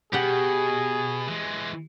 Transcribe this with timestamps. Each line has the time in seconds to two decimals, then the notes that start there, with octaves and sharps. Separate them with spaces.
0.13 B2 G4 G#4 F#5
1.28 E3 G#3